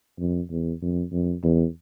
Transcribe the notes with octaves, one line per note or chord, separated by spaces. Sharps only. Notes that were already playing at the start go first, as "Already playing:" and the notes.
F2
E2
F2
F2
E2